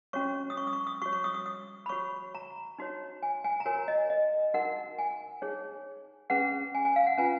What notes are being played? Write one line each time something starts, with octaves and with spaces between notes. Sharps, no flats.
C#4 F#4 C#5 C#6
D#6
C#6
D#6
C#6
D#6
F#4 C#5 C#6
C#6
D#6
D#6
D#6
B5
F#4 C#5 C#6
A#5
D#4 F#4 C#5
G#5
G#5
A#5
F#4 A#4 C#5 G#5
D#5
D#5
D#4 F#4 A#4 F#5
G#5
D#4 G#4 C#5
C#4 G#4 B4 F#5
G#5
G#5
F5
F#5
C#4 F4 B4 G#5